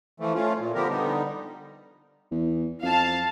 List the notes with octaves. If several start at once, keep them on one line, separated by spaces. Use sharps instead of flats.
E3 F3 A3
A3 C#4 F4
A#2
D3 F3 B3 G4 A#4
D3 G3 B3 D#4
E2
F2 F5 A5